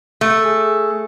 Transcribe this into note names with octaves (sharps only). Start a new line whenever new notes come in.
A3
G#4